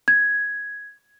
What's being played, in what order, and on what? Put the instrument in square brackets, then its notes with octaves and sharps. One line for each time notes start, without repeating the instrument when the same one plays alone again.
[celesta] G#6